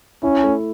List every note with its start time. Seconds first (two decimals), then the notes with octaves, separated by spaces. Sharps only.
0.23 C#4 E4
0.43 A3